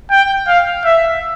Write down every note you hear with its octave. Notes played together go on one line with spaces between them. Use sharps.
G5
F5
E5